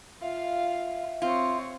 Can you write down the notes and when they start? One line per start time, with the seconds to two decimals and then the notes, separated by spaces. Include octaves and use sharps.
0.22 F4 E5 F5
1.22 C4 F4 C#5